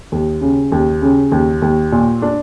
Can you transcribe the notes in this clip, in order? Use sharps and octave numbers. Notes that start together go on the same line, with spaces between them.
D#2
C#3
D#2
C#3
D#2
D#2
A#2
D4